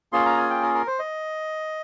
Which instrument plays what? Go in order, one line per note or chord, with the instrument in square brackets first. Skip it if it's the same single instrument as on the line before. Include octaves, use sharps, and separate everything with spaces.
[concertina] A#3 C#4 F4 G#4 C6
A#5
G#5
G5
A#4
A#4
C5
D#5